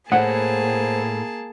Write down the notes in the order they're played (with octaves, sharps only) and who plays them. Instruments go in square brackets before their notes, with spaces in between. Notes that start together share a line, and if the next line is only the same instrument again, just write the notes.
[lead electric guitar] A2 [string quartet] A#3 G#4 A5 [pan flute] C5 [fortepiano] F#5